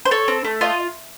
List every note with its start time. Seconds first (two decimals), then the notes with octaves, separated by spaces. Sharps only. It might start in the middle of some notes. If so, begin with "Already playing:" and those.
0.05 C5
0.11 A4 C#5
0.28 C4
0.45 A3
0.61 F4 D#5